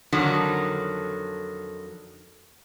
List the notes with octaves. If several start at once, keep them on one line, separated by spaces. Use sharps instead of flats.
F2 D3 D#3 F#3